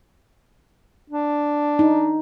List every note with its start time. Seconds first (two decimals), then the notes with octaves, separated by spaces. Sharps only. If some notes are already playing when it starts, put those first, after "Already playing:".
1.10 D4
1.79 D#4